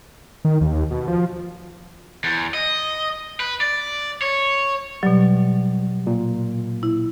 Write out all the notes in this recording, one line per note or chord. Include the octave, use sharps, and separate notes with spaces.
D#3
D#2
B2
F3
E2
D#5
B4
D5
C#5
B2 F#3 G3
A#2
E4